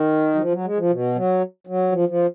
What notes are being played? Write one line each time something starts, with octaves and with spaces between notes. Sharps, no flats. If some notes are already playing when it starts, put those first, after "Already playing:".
Already playing: D#3
F#3
F3
F#3
G#3
F3
B2
F#3
F#3
F3
F3